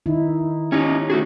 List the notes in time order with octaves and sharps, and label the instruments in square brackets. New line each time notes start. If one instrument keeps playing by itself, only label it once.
[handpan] D#3 D#4 E4
[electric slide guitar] C#4 D#4 [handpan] G4 C#5
[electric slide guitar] A3 F#4 G#4